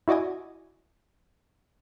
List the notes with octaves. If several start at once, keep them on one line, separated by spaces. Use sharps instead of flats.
E4 F#4 D5 D#5 G#5